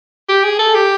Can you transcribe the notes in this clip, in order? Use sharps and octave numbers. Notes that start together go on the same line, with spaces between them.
G4
G#4
A4
G4